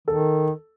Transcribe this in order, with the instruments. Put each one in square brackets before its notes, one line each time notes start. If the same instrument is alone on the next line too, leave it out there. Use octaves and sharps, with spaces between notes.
[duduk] D#3 [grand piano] A4